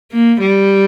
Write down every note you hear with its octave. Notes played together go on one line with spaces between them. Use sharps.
A#3
G3